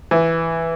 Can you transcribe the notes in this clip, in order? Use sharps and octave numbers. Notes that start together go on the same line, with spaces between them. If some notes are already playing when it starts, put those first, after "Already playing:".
E3